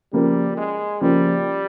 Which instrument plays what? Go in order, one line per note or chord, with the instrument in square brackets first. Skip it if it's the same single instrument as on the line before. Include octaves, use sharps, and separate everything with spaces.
[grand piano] C#3 F3 A#3 [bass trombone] G3
[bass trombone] G#3
[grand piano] C#3 F3 A#3 [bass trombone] G3